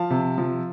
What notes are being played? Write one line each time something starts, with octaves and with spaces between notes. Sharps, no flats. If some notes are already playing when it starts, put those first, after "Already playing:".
Already playing: F3 F5 A5
C3
F3